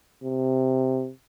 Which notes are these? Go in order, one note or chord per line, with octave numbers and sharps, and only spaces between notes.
C3